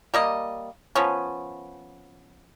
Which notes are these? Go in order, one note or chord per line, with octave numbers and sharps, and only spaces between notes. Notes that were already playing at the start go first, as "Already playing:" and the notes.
G3 A#3 D#5
F3 B3 C#4